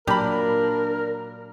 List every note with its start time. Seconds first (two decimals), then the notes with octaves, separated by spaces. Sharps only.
0.07 A#2 F#3 A#3 D4 G4 A#4 B5